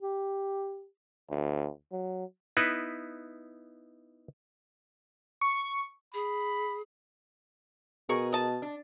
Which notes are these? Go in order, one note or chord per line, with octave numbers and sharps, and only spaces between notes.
G4
D2
F#3
B3 D#4 E4 B4
C#6
G#4 B5
B2 G#4 A#4 C#6
D#5 A5
D4